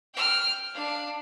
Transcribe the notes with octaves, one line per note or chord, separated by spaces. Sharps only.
G5 F6
D4 F5